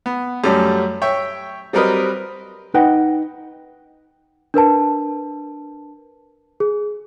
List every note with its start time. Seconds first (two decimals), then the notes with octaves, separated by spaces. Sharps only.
0.06 B3
0.44 F#2 G3 A3 C#4
1.02 C#5 E5 G5
1.73 F#3 G3 C4 A#4 B4 D#5
2.74 D#4 B4 D#5 F#5 G5
4.54 D4 A#4 B4 A5
6.60 G#4